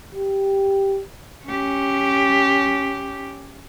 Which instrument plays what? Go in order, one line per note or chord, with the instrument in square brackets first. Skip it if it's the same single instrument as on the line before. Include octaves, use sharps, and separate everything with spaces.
[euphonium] G4
[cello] C#4 G4